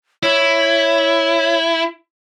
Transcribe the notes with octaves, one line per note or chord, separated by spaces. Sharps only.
E4 C#5